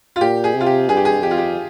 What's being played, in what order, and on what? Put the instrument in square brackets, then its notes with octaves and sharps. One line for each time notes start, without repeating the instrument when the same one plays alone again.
[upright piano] F4
[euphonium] A#2 [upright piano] G4
[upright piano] G#4
[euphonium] C3
[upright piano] F4
G4
[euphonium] G2 [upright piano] G#4
[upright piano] G4
G#4
[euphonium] F2 [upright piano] G4
[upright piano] F4
G4